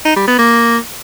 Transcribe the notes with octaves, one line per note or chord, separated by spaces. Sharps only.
D#4
G3
B3
A#3